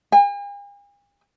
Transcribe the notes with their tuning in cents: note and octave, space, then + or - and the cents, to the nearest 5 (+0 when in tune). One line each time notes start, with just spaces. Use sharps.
G#5 -45